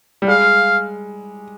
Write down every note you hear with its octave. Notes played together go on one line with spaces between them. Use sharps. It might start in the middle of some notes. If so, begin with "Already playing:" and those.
G3
G#3 F5